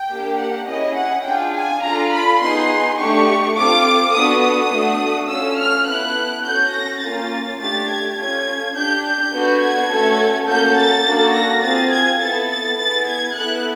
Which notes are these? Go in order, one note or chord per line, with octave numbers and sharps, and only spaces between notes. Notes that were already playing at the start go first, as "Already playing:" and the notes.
Already playing: G5
A#3 D4 G4
F#5
C#4 E4 G#4 D#5
F#5
D4 F4 G#4 G5
G#5
D4 F4 A4 A#5
B5
B3 D#4 G#4 C6
A3 D4 G4 C#6
C4 F4 A4 D6
B3 D4 F#4 A4 D#6
D#6
A3 D4 F#4 A4
C#4 F4 A4 E6
F6
B3 E4 A4 F#6
C#4 F#4 A4 G6
A#6
A#3 C#4 F4 A6
A3 D4 G4 A6
G#6
C#4 F4 A4 G#6
D4 G4 G6
G6
B3 D4 F#4 A4
G#6
A3 C#4 F#4 A4
A#3 C#4 F#4 A4 G6
A6
A#3 D4 F#4 A4
A#6
C4 F4 G#4 A6
G#6
B3 E4 A4 A6
A6
B3 E4 G#4 A6
G#6
B3 E4 A4 F#6